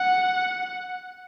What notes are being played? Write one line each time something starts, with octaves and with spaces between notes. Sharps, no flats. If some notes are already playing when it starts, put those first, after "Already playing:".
Already playing: F#5